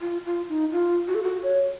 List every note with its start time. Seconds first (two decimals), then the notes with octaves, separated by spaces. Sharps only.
0.01 F4
0.25 F4
0.49 D#4
0.72 F4
1.08 F#4
1.15 A4
1.23 F#4
1.43 C#5